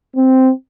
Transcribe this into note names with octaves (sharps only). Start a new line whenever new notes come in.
C4